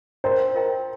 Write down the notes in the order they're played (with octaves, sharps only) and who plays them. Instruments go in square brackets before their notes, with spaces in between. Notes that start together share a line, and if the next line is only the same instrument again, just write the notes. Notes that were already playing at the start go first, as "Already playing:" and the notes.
[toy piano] F4 A#4 D#5 G5 A#5 [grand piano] C5
[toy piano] F4 A#4 D#5 G5 A#5